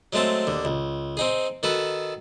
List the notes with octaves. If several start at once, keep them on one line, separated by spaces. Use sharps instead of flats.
F#3 G#3 A3 C4 A5
D#2 D3
C#2
C4 D#4 G#4
D#3 F#4 A4 B4